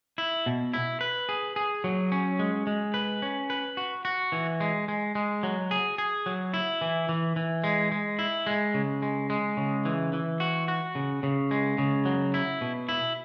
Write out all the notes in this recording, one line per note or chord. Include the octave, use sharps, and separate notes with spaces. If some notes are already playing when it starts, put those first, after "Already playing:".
E4
B2
E4
B4
G#4
G#4
F#3
C#4
G#3
G#3
B4
C#4
B4
F#4
F#4
E3
G#3
G#3
G#3
F#3
G#4
G#4
F#3
E4
E3
E3
E3
G#3
G#3
E4
G#3
C#3
G#3
G#3
C#3
E3
E3
F#4
F#4
C#3
C#3
G#3
C#3
F#3
E4
B2
E4